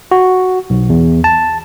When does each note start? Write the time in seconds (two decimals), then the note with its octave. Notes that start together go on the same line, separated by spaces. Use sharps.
0.11 F#4
0.70 B1
0.90 E2
1.24 A5